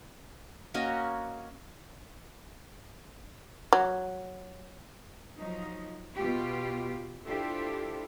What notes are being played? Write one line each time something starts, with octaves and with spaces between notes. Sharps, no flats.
A#3 C#4 F#4 D#5
F#3
F3 F#3 D#4
B2 F4 G4
D4 E4 F4 G4 A4 C5